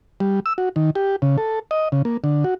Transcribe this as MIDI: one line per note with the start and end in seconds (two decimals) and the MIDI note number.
0.20 0.40 55
0.46 0.53 88
0.58 0.69 66
0.76 0.90 51
0.95 1.16 67
1.22 1.37 49
1.38 1.59 69
1.71 1.89 75
1.92 2.02 49
2.05 2.17 58
2.24 2.44 50
2.44 2.54 66